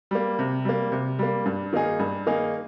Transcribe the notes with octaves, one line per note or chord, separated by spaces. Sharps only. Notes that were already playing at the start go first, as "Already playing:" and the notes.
G3 A#3
C3
G3 A#3
C3
G3 A#3
G2
D#3 A#3 D#4 G#4
G2
D#3 A#3 D#4 G#4